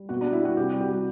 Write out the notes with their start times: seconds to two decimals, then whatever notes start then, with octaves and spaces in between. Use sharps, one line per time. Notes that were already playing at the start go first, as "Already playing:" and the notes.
Already playing: G3
0.09 B2 F#4
0.21 G3 D4
0.33 E4
0.41 G3 F#4
0.57 C3 G4
0.69 G3 F#4
0.81 G4
0.89 G3 F#4